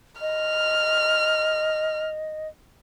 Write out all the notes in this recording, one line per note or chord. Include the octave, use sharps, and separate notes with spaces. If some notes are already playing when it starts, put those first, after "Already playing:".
D#5 F6